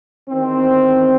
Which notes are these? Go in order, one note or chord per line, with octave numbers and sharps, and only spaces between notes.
E2 D#3 C4